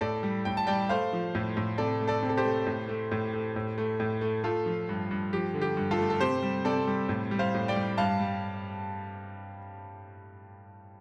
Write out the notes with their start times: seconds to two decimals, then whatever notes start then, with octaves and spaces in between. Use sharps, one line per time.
0.01 A2 A4 D5
0.23 G3
0.45 A2 G5
0.57 A5
0.67 G3 D5 G5
0.89 A3 C5 F5
1.13 F3
1.35 A2
1.57 A2
1.78 C3 A4 D5
2.01 A3
2.07 A4 D5
2.23 C3
2.29 A4
2.37 G4 C5
2.45 A3
2.67 A2
2.89 A3
3.12 A2
3.34 A3
3.56 A2
3.78 A3
4.00 A2
4.21 A3
4.43 A3 F4 A4
4.66 F3
4.89 G2
5.11 G2
5.33 F3 G4
5.54 D3
5.61 G4
5.77 G2
5.91 F4 A4
5.98 A3
6.10 A4
6.20 C3 G4 C5
6.43 G3
6.65 C3 A4 D5
6.87 G3
7.09 A2
7.31 G3
7.39 C5 F5
7.54 A2
7.68 D5 G5
7.76 G3
7.97 G2 F5 A5
8.20 G3